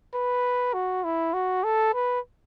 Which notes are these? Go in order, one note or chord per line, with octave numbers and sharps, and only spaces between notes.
B4
F#4
E4
F#4
A4
B4